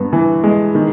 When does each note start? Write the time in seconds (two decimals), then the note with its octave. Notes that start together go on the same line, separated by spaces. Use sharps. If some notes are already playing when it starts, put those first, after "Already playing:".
Already playing: G2 B3
0.13 E3
0.44 G#3
0.75 D#3